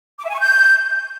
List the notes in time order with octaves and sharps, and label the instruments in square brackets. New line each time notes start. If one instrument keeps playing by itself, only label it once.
[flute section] D6
E5
G#5
C#6
G6